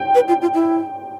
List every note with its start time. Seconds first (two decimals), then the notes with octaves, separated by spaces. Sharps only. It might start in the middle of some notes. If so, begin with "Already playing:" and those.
Already playing: G5
0.14 B4
0.28 F4
0.41 F4
0.54 E4